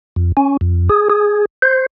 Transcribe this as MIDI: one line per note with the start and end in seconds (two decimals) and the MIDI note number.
0.16 0.32 41
0.37 0.57 61
0.61 0.89 41
0.89 1.08 68
1.10 1.45 68
1.62 1.86 72